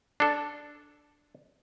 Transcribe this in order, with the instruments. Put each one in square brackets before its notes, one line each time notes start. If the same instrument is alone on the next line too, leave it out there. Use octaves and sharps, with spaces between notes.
[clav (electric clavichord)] D4 A4